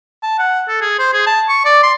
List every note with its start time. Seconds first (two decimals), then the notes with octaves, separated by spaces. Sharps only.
0.23 A5
0.38 F#5
0.68 A4
0.81 G#4
0.99 C5
1.13 G#4
1.27 A5
1.49 C#6
1.65 D5
1.83 C6